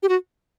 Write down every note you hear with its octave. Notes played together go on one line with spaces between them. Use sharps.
G4
F#4